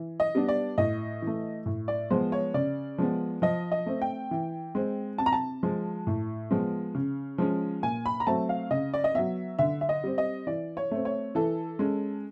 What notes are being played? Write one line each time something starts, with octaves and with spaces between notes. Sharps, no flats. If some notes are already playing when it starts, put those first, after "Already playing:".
Already playing: E3
D#5
G3 B3 D4
D5
A2 D#5
E3 A3
A2
D5
F3 G#3 B3 C5
C#5
C#3 D5
F3 G#3 B3
F3 D#5
D#5
A3 C4
G5
E3
G#3 C4
C3 A5
A#5
A5
F3 G#3
A2
F3 G#3 B3
C#3
F3 G#3 C#4
A#2 G#5
B5
A#5
F#3 A3 C4 A5
F5
C#3 D#5
D5
D#5
F#3 B3 E5
D3 E5
E5
D#5
G3 C4
D#5
E3 D5
C#5
A3 C4
C#5
E3 A4
G#3 C#4